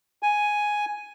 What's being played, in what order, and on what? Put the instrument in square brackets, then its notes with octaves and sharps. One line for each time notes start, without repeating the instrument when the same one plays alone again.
[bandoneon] G#5